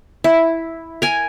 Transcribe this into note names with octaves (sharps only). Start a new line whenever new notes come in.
E4
A#4 G#5